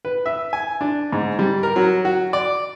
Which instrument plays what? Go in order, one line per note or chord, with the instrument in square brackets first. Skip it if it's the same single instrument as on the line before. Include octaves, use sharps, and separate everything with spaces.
[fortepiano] B4
E5
G#5
D4
G#2
G3
A#4
F#3
F#4
D5